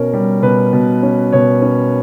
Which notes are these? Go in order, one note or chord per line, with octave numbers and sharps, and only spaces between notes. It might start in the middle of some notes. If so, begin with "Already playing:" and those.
Already playing: B2 C#4 A#4
G3
B2 B4
B2
C#4
B2 C#5
C#4